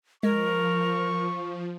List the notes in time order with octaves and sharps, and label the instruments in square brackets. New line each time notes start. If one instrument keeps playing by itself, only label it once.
[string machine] F3 [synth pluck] G#3 [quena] A#4 [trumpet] C#6